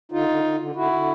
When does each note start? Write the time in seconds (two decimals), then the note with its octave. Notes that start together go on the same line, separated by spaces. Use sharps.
0.12 D3 D#4 F4
0.29 D3
0.44 D3
0.60 D3
0.75 D3 E4 F#4
0.92 D3